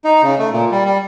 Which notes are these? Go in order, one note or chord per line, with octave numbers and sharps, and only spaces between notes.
D#4
C#3
A3
A#2
G3
G3